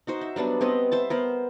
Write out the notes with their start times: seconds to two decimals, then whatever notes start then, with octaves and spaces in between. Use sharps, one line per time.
0.07 D#4 F#4 C5
0.21 E5
0.36 F#3 G3 B3 D4
0.61 B3 C4 B4 D#5
0.92 C5 E5 A5
1.10 B3 A#4 C5